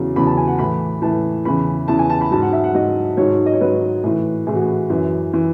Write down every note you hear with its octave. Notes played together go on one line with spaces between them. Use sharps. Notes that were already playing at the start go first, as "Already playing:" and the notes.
Already playing: E2 C#3 F#3
E2 C#3 F#3 B5
A5
G#5
F#5
A2 E3 B5
A2 E3 A5
E2 C#3 E3 B5
E2 C#3 E3 A5
G#5
A5
B5
G#2 F#3 A5
F#5
E5
F#5
G#2 F#3 D#5
G#2 D#3 F#3 C#5
D#5
C#5
G#2 D#3 F#3 B4
A2 E3
A2 E3 G#4
F#4
G#4
F#2 E3
E3